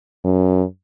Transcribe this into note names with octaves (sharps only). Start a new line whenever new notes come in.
F#2